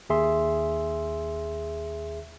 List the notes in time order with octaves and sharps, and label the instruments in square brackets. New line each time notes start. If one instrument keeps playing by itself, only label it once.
[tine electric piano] D#2 G#4 E5 C6